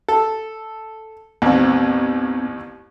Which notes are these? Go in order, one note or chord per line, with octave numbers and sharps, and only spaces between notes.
A4
A1 D#2 B3 C4